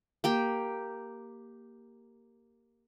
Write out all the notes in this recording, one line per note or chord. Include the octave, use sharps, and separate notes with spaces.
A#3 G4 G5